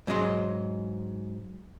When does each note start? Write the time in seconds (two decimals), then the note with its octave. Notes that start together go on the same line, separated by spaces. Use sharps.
0.07 G#2 F#3 C#4 D#5 C6